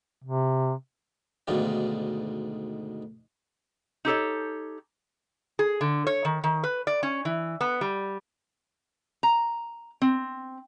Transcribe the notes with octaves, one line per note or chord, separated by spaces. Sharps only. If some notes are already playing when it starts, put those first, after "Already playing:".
C3
D2 G#2 B2 D#3 F4 D5
D#4 G4 A4 C#5
G#4
D3
C#5
D#3
D#3
B4
D5
C#4
E3
B3
G3
A#5
C4